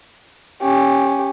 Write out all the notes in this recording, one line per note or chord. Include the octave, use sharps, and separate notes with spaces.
C#4 G4